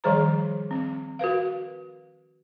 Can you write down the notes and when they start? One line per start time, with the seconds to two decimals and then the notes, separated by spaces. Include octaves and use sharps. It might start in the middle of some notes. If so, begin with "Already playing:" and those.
0.04 D#3 F3 G3 G#4 C5 A#5
0.71 C4
1.19 F#4 A#4 B4 F5